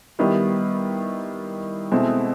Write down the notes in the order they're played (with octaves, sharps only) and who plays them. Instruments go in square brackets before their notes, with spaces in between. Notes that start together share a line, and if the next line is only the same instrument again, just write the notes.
[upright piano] D#3 G3 B3 E4 G4
B2 G#3 C4 E4 A4